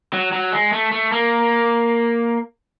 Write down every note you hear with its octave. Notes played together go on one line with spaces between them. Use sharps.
F#3
F#3
G#3
A3
A3
A#3